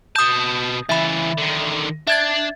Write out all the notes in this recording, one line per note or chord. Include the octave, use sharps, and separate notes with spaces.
B2 A5 D#6 G6
C#3 E3 E5 B5
D3 D#3
D4 E5 G#6 A6